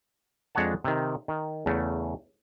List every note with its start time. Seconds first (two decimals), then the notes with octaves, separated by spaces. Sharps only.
0.55 F2 G#3 D4 C#5 F#5 A5
0.84 C3 D#3
1.28 D#3
1.66 E2 C#3 A3